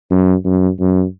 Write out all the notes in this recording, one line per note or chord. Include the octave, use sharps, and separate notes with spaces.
F#2
F#2
F#2